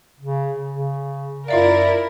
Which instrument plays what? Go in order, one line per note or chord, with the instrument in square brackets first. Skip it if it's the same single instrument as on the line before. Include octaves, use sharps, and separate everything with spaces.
[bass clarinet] C#3
C#3
[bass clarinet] F#2 [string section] E4 A#4 [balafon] F4 E5 F5 [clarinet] D5